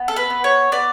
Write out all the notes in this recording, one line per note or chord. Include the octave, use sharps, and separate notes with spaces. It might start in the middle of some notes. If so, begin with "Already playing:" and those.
Already playing: B3
A4
B4
B3
C#5
B3 D5